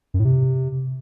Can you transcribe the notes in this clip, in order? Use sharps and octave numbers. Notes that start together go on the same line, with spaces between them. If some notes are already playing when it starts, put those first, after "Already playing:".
F#2
A2
C3